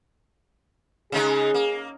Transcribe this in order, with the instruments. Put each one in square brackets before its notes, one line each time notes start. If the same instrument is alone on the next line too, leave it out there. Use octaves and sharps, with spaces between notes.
[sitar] C#3 G#3 D#4 [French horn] G#4
[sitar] A#3